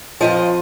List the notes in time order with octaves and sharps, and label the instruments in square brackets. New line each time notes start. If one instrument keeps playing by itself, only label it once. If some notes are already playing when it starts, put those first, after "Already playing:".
[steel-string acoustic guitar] F2 C#3 F3 D#5